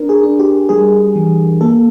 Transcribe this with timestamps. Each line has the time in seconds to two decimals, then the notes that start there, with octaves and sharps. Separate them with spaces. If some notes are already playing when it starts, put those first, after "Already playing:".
Already playing: D4 A#4
0.09 G#4
0.23 D4
0.39 G4
0.69 G3 G#4
1.15 E3
1.61 A#3 A4